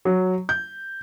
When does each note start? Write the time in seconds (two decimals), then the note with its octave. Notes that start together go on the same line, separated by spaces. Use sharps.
0.05 F#3
0.49 G6